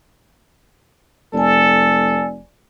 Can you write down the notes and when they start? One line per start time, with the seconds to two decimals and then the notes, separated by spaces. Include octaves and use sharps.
1.33 F1 A4 D5 G#5